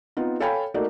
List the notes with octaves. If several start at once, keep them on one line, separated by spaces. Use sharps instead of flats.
B3 C4 D#4 F4
A4 C#5 F5 G5 G#5 B5
A3 A#3 D#4 F#4 D5